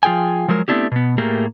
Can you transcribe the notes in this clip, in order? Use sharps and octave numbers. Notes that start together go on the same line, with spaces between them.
F3 F4 G#4 G5 G#5
F3 F#3 G#3 A#4
A3 B3 C4 D4 E4 G4
B2 B3
A2 A3 A#3 G4 G#4 A#4